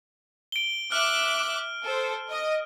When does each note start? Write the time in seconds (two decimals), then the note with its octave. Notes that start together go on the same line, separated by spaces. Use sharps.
0.52 D7 G7
0.92 E5 D6 F6 F#6
1.83 A4 C5
2.30 D#5